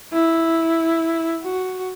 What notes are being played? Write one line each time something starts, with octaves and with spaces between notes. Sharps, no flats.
E4
F#4